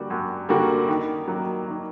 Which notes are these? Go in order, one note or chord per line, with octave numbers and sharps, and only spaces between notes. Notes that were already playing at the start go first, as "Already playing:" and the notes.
Already playing: F#2 D3 G3 A#3 F#4
F#2
D3 G3 A#3 F#4
D#3
F#3 A#3 F#4
D#3